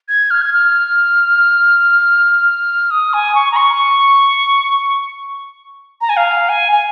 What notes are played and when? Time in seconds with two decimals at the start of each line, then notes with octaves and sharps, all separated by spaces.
0.08 G#6
0.30 F6
0.41 G#6
0.53 F6
2.90 D#6
3.13 G#5
3.35 C#6
3.51 A#5
3.56 C#6
6.01 A#5
6.09 G#5
6.16 F5
6.49 G#5
6.72 G#5